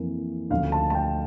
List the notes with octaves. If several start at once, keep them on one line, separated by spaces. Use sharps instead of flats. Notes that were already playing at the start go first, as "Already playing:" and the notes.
Already playing: F2 E3 A#3
D2 C#3 F3 A3 F5
A5
A5
G5